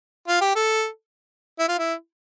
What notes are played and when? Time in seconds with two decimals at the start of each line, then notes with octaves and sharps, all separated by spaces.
0.28 F4
0.41 G4
0.55 A4
1.59 E4
1.68 F4
1.78 E4